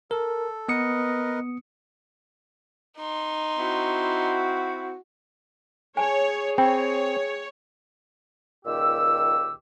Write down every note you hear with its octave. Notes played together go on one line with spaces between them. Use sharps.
A4 A#4
B3 A#4 B4 D#5 D#6 C#7
D#4 C6
C4 E4 F#4
G#4 C#5 G#5 A5
C4 C#5 G5 B5
C#2 A#2 D#3 G4 E6